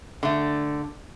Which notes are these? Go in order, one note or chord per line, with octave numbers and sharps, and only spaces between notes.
D3 A3